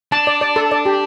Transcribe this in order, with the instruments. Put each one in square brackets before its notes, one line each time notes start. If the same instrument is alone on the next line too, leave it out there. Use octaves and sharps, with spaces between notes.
[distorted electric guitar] D4 [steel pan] A5
[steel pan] D5
D5
A4
D5
G4